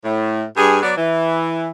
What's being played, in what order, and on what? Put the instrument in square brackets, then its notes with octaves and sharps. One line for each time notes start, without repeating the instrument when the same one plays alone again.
[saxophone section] A2
G2 G#4
F#3 B3 D5
E3